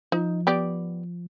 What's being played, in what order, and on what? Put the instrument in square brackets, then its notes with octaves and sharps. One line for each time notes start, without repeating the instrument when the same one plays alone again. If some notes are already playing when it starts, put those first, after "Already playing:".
[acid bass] F3 [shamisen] D#4
[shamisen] B3 G4 D5